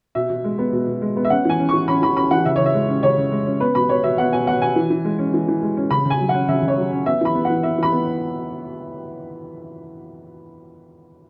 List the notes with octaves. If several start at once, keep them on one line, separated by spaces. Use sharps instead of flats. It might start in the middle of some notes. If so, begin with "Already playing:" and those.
B2 E5
B2
G#3
B3
B2
B2
G#3
B3
E5
C#4 F#5
E3 G#5
C#4
E3 C#6
C#4 B5
E3 B5
C#4 B5
E3 F#5
C#3 E5
C#3 C#5
E5
G#3
C#4
C#3 C#5
C#3
G#3
C#4
B3 B4
B2 B5
B3 C#5
B2 E5
B3 F#5
B2 G#5
B3 F#5
B2 G#5
E3
E3
G#3
C#4
E3
E3
G#3
C#4
C#3 B5
C#3
G#5
F#3
F#5
C#4
C#3 E5
C#3
C#5
F#3
C#4
B3 E5
E3 B5
B3
E3 F#5
B3 E5
E3 B5
B3